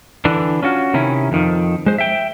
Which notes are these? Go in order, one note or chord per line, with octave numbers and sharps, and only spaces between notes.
D3 E3 D4
C#4 F4 F#4
C3 D#3 C#4 E4
F2 D#3 F3
G#3 C5
E5 G5